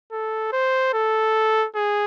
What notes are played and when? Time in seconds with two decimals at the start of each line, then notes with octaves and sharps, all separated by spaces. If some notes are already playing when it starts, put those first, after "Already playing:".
0.12 A4
0.53 C5
0.94 A4
1.75 G#4